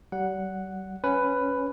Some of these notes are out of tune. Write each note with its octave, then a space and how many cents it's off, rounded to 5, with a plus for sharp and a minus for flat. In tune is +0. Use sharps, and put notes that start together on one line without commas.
G3 -40 F#5 +0
C#4 +0 B4 +10